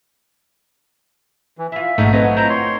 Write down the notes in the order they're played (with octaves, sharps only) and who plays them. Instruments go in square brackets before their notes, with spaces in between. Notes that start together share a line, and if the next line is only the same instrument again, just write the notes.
[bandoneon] E3
[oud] E4 F4 [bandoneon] E5
[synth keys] A1 G#2 [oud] B2 F#3 A#3 [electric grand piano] A3 D#4
[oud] F#3 C#5 D#5 [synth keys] C4 B4
[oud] E4 F4 C5 [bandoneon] A#5 G6
[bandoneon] C#5 C6